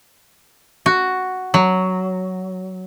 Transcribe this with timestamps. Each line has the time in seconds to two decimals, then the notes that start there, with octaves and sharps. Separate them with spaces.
0.86 F#4
1.54 F#3